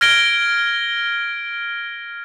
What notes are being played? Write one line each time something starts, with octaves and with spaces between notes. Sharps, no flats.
F6 G#6 A#6 D7 G7